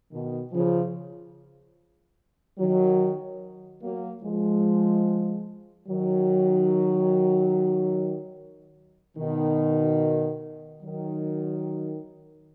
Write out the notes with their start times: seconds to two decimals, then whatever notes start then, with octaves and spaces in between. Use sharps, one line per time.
0.12 B2 D#3
0.53 C#3 F3
2.59 D#3 F#3
3.82 F#3 A#3
4.23 F3 G#3
5.88 D#3 F#3
9.18 B2 D#3
10.83 D#3 F#3